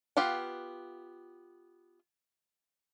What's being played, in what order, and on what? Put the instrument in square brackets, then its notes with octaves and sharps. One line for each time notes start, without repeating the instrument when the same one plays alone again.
[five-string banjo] B3 F4 G4 F5 F#5